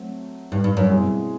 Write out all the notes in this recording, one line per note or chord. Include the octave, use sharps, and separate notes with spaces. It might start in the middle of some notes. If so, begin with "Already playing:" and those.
Already playing: F#3 A3 C4
G2
G2
F#2
B2 G#3 C4 E4 G#4